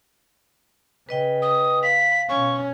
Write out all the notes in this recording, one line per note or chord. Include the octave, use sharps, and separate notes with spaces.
C#3 B4 D#5 G5
D#6
F5 B6
B2 C#4 C#6